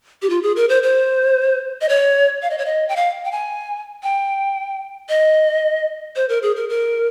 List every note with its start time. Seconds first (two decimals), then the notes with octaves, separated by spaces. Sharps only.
0.22 G4
0.30 F4
0.43 G#4
0.56 A#4
0.69 C5
0.83 C5
1.81 D#5
1.89 C#5
2.42 F5
2.50 D#5
2.58 C#5
2.66 D#5
2.89 G5
2.96 F5
3.25 G5
3.32 G#5
4.03 G5
5.09 D#5
6.16 C5
6.29 A#4
6.43 G#4
6.56 A#4
6.69 A#4